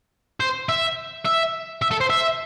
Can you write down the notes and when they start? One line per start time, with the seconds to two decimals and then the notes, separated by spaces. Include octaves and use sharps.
0.40 C5
0.69 E5
1.25 E5
1.82 E5
1.91 A4
2.01 C5
2.10 E5